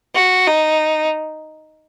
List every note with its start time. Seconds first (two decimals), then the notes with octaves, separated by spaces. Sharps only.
0.15 F#4
0.48 D#4